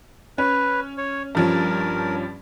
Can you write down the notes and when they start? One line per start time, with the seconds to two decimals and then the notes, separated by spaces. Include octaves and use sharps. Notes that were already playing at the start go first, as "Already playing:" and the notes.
0.38 C#4 B4
0.98 C#5
1.35 G2 F3 C#4 A#4